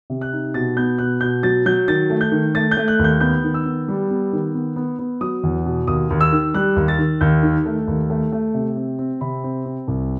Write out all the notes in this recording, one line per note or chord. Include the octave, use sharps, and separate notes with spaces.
C3
F#6
D#4
B2 A6
B3 G6
B2 F#6
B2 G6
F#3 A6
F#3 G6
D#3 A6
A3
G6
D#3
A3 A6
G6
A3
F#6
D#2
G6
B3 G6
D#3
E6
B3
G3
B3
D#3
B3
B3
B3
F#3 D#6
E2
B2
D#2 D#6
D#2
E6
D#3
G3 F#6
D#2
A6
D#3
D#2 G6
D#3
A3
D#2
A3
A3
C3
C4
C4
C3 B5
C4
C4
C2